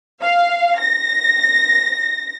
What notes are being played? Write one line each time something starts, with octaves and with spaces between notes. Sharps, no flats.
F5
A#6